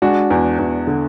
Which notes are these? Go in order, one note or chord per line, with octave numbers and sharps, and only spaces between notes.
G#3 D4 F#4
E2
E2
D3